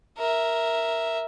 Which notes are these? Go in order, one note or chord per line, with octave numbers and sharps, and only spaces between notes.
A#4 E5